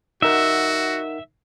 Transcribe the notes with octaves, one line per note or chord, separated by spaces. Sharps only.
D#4 F#4 A#4 E5 F#5